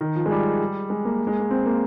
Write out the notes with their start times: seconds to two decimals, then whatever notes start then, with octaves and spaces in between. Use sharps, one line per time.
0.01 D#3
0.16 F3
0.26 G#3
0.31 G3
0.90 G#3
1.05 A#3
1.27 G#3
1.39 A#3
1.51 C4
1.66 A#3